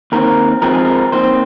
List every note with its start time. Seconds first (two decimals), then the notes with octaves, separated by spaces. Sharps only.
0.12 D#2 D#3 C4 A#4
0.62 F2 F3 G#3 C4 A#4
0.74 G#4
0.85 A#4
1.12 D#2 D#3 C4 C5